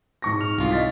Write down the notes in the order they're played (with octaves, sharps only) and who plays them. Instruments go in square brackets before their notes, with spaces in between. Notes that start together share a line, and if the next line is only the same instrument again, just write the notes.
[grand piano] G#2 C#6 A#6
[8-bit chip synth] F6
C2 F4
[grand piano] D#5 A6 B6